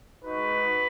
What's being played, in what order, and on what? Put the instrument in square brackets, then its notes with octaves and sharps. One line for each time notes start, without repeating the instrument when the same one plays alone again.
[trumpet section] G#3 D#4 F#4 B4